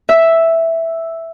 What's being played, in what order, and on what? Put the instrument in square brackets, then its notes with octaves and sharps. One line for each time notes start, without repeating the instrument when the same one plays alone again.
[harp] E5